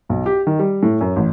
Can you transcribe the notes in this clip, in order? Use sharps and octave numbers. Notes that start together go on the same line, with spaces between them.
B1
G4
D#3
G3
A2
F#2
A1